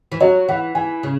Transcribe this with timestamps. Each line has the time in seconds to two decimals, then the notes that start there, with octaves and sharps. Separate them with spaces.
0.12 E3
0.20 F#3 C#5
0.49 E3 F#5
0.75 E3 G#5
1.03 C#3